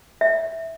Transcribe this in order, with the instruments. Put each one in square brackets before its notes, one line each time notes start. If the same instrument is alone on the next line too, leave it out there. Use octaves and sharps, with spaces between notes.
[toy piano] E5